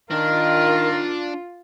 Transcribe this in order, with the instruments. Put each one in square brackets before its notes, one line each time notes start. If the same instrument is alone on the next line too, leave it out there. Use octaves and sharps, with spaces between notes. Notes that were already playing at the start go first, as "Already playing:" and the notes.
[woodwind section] D#3 [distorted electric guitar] D4 [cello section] F4 [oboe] A#4